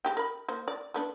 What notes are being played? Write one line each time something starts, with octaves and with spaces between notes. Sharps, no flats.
G#3 G4 G5
A#4 B5
A#3 C5
D5
A3 B3 D4